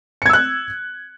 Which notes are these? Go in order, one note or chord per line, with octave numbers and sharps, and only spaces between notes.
E6 F#6 G#6 C#7